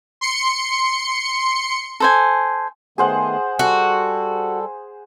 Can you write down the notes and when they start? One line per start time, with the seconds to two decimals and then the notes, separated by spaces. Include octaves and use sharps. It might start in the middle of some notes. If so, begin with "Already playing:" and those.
0.21 C6 C#7
2.00 A4 C5 G#5
2.98 D#3 A3 B3 G#4 C5 F#5
3.59 G3 F#4 A4